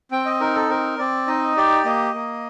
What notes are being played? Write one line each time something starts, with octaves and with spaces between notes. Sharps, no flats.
C4 G5
D#5
D#4 A#4
A4
C4 A#4
C4 D5
D#4 D#5
G4 D5
A#3 D#5
A#3